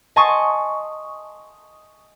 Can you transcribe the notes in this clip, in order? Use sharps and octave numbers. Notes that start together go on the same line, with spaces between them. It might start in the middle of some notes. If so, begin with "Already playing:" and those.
D#5 G#5 A5 C6 C#6 D#6